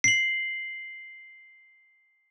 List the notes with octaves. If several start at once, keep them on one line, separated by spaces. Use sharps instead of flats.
C7 F#7